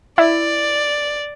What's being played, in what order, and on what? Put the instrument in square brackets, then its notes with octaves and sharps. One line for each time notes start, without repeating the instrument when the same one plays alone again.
[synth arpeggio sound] E4 [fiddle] D5